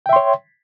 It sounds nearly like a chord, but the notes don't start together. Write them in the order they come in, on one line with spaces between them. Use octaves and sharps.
G5 E5 C6 C#5